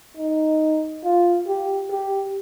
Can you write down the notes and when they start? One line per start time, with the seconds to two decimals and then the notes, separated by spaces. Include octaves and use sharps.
0.17 D#4
1.04 F4
1.47 G4
1.90 G4